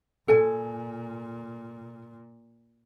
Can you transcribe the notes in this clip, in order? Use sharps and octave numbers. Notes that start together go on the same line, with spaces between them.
A#2 A4 G#5